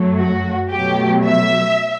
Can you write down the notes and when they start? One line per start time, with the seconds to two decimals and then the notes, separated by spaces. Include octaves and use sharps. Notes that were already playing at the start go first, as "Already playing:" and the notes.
Already playing: F#2 F#3 A3
0.17 F#4
0.71 B2 F#3 A3 G4
1.24 E5